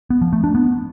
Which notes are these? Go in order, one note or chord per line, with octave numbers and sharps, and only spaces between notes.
B3
F3
A3
D4
B3